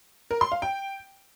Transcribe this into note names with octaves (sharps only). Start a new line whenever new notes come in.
A#4
C6
F5
G5